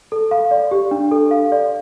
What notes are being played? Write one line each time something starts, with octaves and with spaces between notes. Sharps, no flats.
A4
F5
D5
G4
D4
A4
F5
D5